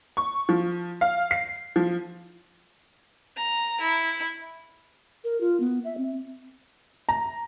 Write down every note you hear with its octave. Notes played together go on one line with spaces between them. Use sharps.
C#6
F3
F5
C7
F3
A#5
E4
A#4
F4
B3
E5
C4
A#5